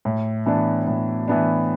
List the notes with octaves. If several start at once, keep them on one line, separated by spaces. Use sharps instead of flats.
A2
E3 B3 D4
A2
E3 B3 D4